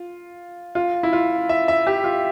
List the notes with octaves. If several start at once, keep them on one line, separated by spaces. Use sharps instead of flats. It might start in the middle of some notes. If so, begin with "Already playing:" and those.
Already playing: F4
F4
E4
F4
E5
E5
G4
F4